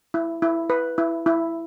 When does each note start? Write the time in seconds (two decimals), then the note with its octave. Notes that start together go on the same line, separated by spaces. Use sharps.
0.14 E4
0.42 E4
0.70 B4
0.98 E4
1.26 E4